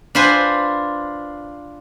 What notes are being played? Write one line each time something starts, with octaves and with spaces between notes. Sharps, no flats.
D4 F4 B4 C5 F#5 G#5